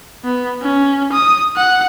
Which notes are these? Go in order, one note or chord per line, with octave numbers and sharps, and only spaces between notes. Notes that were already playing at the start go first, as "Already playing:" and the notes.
B3
C#4
D#6
F#5